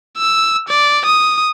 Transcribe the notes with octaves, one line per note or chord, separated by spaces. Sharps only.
E6
D5
D#6